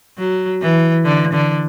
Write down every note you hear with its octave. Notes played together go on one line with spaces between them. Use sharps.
F#3
E3
D3
D3